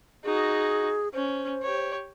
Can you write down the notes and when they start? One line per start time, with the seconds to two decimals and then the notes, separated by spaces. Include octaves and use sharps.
0.24 D#4 F#4 G#4
1.14 C#4 C5
1.63 G4 C#5